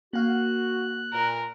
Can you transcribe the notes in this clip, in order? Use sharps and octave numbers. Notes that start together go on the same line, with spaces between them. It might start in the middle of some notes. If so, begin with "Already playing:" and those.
A#3 F#4 F5 F#6
A#2 A#4